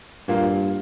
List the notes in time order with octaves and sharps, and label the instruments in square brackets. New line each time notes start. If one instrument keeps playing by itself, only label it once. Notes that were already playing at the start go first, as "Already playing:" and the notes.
[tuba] G2 [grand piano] A#2 A#3 F4